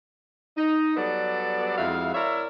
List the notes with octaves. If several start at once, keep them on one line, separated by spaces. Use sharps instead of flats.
D#4
F#3 G3 B3 A4 D5
F2 G#3 E4 F#4 E5 F5
E4 A#4 C#5 D5 E5